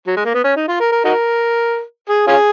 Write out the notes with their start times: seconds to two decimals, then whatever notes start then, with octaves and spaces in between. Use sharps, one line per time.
0.07 F#3
0.16 G#3
0.25 A#3
0.34 B3
0.44 C#4
0.56 D#4
0.68 F4
0.80 A#4
0.92 A#4
1.05 D#4 F#4 A#4
2.09 G#4
2.27 C#4 F4 G#4